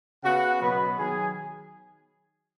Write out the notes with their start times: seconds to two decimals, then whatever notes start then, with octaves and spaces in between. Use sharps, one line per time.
0.24 C#3 B3 F#4 F#5
0.61 B2 F#3 B3 B4 B5
0.98 D#3 F#3 G#4 G#5